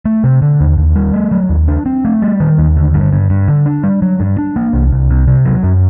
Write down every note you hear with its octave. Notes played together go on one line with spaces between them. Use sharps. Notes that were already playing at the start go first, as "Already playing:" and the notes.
A3
C3
D3
D#2
D#2
G3
A3
F#3
D#2
D4
C4
A3
G3
D#3
D#2
D3
G2
G2
G2
D3
D4
G3
F#3
G2
D4
A#3
C2
C2
C3
C3
F#3
F#2